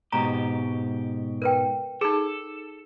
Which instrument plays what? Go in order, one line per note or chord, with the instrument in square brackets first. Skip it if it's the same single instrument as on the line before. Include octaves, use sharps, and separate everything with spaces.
[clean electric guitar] G#2 B2 G4 [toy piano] A#5
[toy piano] A#4 B4 G5
[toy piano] D#4 G#4 [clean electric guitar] A4